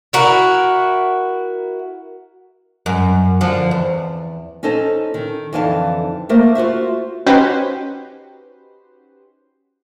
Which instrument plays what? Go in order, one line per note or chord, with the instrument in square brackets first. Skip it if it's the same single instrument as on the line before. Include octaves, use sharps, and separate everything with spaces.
[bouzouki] E4 F#4 A#4
[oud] F#2
D3 F3
E2
[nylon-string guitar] C#4 D#4 A4 C5 A5
D#3
F2 D3 E3 D#4 F5 A5
A3 A#3 A#4 C5
F4 F#4 C5 E5
[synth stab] C#4 D#4 F#4 G4 B4 C5